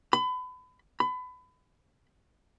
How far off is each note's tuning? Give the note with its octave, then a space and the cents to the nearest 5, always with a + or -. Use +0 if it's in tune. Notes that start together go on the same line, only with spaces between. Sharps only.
B5 +30
B5 +30